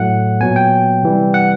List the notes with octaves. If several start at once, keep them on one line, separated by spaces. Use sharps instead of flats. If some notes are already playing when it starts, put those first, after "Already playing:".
Already playing: A2 F#3 A3 F#5
A#2 F#3 B3 G#5
G5
C3 E3 G3
F#5